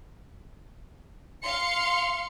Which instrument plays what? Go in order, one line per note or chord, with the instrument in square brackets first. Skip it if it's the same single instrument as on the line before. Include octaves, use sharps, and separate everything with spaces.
[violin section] F5 C6 C#7